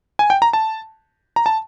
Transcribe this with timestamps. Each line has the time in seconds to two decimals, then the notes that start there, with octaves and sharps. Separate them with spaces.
0.19 G#5
0.30 G5
0.42 A#5
0.53 A5
1.36 A#5
1.46 A5